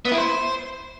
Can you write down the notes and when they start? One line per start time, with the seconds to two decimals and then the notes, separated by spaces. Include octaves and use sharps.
0.05 B3
0.12 E4
0.18 C5